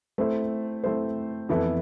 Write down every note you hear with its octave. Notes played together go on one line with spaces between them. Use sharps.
A3 C4 E4 A4 C5
A3 C4 E4 A4 C5
F2 E3 B3 E4 A4